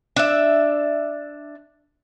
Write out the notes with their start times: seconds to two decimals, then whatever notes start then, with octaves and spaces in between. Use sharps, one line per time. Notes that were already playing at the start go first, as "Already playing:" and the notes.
0.16 D4 E5